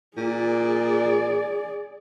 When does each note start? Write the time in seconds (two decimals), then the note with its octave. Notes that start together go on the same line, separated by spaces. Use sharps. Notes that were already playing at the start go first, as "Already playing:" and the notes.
0.17 A#2 G#4 D5